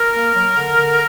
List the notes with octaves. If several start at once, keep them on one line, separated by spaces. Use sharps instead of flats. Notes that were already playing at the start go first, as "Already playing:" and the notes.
Already playing: A#4
A#3
F#3
D3
D3